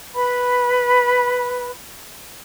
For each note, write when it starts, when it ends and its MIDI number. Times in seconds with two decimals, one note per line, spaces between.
0.15 1.70 71
0.15 1.70 83